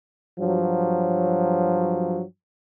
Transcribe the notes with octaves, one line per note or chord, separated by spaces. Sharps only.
G2 F3 F#3